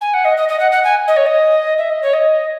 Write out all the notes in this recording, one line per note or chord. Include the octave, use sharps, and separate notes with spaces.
G#5
F#5
D#5
D#5
D#5
F#5
F#5
G#5
D#5
C#5
D#5
E5
D#5
C#5
D#5